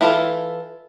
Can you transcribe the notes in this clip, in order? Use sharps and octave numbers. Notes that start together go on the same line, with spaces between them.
E3 E4 F4 G#4 A4